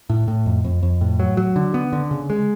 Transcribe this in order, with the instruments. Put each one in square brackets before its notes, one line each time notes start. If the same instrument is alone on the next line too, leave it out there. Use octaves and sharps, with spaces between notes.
[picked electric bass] A2
A2
F2
F2
F2
A2
F#3
F#3
D3
B3
D3
C#3
G#3